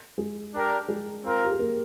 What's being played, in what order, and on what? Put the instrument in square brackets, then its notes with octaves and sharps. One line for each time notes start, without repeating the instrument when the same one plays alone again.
[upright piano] G#3 G#4
[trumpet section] D4 G4 A#4 D5
[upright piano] G#3 G#4
[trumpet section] C4 F4 A#4
[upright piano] G4
G#4
A#3 A#4